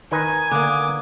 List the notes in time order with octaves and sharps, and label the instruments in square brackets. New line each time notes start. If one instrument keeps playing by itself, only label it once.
[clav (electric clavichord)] D#3 D#4 B4 [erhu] G#5
[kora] D3 A#3 [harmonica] D6 D#6